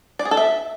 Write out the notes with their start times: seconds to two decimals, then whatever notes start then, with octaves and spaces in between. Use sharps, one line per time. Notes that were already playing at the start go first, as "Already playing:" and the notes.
0.19 D5
0.25 G#4
0.31 A4
0.37 E5